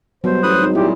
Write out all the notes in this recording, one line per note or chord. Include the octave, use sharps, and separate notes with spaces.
B2 F#3 G3 C5
A1 B4 D#6 F#6
G#1 D#4
A#2 E4 G4